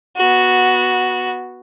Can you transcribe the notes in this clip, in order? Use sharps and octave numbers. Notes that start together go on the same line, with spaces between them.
B3 F#4